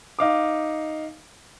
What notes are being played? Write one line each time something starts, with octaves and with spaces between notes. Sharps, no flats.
D#4 F5 D6